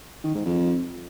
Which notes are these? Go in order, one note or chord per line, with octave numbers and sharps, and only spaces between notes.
D#3
G#2
F2